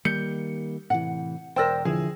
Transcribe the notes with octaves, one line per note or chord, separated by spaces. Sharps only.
D#3 G3 A#3 G6 C#7
A2 C3 E3 F#5
E1 A#4 C5 D5 G5 E6 A#6
D3 F3 E4 G#4